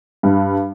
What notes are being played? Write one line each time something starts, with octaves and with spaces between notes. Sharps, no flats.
G2